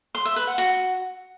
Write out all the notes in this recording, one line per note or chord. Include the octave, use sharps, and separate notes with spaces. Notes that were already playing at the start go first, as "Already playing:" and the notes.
C6
E5
B4
F#5
F#4